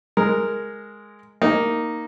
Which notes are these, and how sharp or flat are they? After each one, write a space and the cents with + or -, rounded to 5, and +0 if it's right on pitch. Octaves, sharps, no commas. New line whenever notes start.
G#3 +0 A#4 -5
A#3 +0 D#4 +0